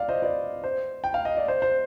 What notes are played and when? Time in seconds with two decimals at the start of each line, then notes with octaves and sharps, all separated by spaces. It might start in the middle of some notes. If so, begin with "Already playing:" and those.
Already playing: D5 F5
0.09 C5 D#5
0.22 B4 D5
0.64 C5
1.04 G5
1.14 F5
1.25 D#5
1.37 D5
1.48 C5
1.62 C5